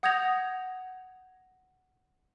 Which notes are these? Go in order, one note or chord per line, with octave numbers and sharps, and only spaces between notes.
F#5 D#6 G6 G#6 A#6 F7